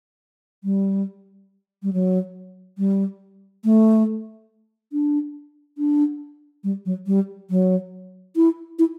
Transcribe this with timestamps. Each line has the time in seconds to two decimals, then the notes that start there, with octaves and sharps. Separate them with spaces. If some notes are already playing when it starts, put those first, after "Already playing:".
0.64 G3
1.83 G3
1.93 F#3
2.78 G3
3.64 A3
4.93 D4
5.78 D4
6.64 G3
6.86 F#3
7.07 G3
7.50 F#3
8.36 E4
8.79 E4